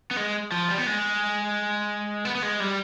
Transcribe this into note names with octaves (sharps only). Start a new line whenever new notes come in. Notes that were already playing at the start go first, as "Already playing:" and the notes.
B3
G#3
F3
G3
B3
G#3
B3
B3
G#3
G3